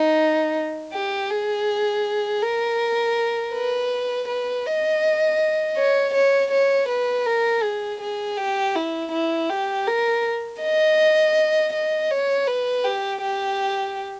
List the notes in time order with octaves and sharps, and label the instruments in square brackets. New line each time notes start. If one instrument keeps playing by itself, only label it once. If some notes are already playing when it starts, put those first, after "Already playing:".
Already playing: [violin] D#4
G4
G#4
A#4
B4
B4
D#5
C#5
C#5
C#5
B4
A#4
G#4
G#4
G4
E4
E4
G4
A#4
D#5
D#5
C#5
B4
G4
G4